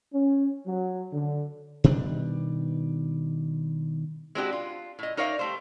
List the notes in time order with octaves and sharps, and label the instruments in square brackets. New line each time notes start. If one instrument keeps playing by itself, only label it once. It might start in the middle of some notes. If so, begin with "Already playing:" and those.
[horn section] C#4
F#3
D3
[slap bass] B2 D#3 G3 D4
[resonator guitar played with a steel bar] G#3 C4 D4 E4 F#4 G4
F4
A2 D#5
D#4 A#4 C#5 D5 E5 F5
G3 A3 C5